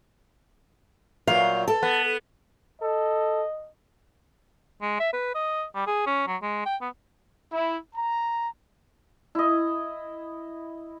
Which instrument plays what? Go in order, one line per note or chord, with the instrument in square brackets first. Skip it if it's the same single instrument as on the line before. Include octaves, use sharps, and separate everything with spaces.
[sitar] A#2 F#3 [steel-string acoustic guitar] F5
[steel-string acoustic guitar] A4
[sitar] B3
[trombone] A4 [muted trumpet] D#5
[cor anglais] G#3
E5
B4
D#5
G3
G#4
C#4
F#3
G#3
G5
B3
[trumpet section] E4
A#5
[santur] E4 D#5